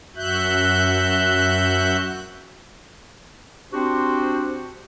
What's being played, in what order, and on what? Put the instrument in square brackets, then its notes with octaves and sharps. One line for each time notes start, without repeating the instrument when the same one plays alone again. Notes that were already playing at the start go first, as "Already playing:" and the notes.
[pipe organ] F#2 F#4 E5 F#6 G6
[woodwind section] C4 D4 F#4 G4 C5